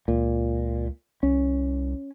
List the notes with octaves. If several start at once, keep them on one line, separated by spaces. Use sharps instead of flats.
C#2 A#2
C2 C#4